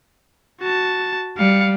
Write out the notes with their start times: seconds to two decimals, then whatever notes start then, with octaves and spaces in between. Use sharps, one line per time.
0.61 F#4 A5
1.38 G3 F5 C#7